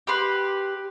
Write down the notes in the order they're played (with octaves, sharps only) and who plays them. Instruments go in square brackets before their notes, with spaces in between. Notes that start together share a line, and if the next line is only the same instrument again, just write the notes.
[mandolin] G4 B4 C6